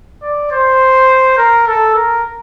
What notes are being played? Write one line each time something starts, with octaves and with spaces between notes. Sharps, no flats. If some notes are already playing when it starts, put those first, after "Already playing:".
D5
C5
A#4
A4
A#4